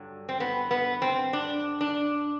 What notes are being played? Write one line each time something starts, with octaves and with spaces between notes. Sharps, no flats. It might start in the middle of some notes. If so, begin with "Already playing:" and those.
Already playing: G2 D3 F#3
C4
B3
B3
C4
D4
D4